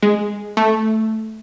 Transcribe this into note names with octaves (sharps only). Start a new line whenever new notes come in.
G#3
A3